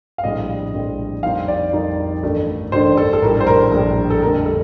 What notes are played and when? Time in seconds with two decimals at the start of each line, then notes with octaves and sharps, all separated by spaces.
0.18 F5
0.23 A#1 A2 G3 C4 D#5
0.73 A#1 A2 G3 C4
1.23 F2 D#3 G3 C4 D#4 F5
1.48 D5
1.72 F2 D#3 G3 C4 D#4
2.23 A1 G2 D#3 A3 D4
2.72 A1 G2 D#3 A3 D4 C5
2.97 A4
3.13 A4
3.22 A#1 A2 G3 A#4
3.41 C5
3.47 A#4
3.71 A#1 A2 G3
4.10 A4
4.22 F2 D3 G3 A#3 A#4
4.46 A4